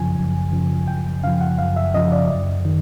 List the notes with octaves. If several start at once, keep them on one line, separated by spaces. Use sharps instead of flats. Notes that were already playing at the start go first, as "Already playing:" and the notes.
Already playing: F#2 C#3 F3 G#5
F#2
C#3 F3
F#2 G5
C#3 F3 F5
F#5
F#2 F5
E5
C#3 F3 D#5
D5
F#2
D#3